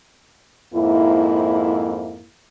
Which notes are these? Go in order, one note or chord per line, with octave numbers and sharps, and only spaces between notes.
F2 G#2 A#3 E4